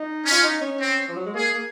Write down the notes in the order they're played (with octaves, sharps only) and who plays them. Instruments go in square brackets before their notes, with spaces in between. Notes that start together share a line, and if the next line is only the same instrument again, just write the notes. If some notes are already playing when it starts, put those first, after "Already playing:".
Already playing: [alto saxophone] D#4
[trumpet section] C#4
[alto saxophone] F4
D#4
C#4
[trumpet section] C4
[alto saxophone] F3
F#3
G#3
[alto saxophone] A#3 [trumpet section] G#4
[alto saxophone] A#3